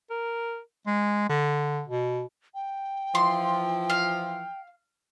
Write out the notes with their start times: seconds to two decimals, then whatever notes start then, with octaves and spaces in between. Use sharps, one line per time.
0.11 A#4
0.86 G#3
1.29 D3
1.88 B2
2.55 G5
3.15 E3 F3 C6
3.90 F5